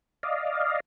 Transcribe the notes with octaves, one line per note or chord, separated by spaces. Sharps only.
D5 D#5 F5